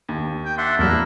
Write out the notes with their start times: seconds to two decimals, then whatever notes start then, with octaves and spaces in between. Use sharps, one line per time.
0.09 D#2
0.45 G5
0.58 D4 E5 F#5 C6
0.79 E2 F#3 A#3 D4 E4 A#4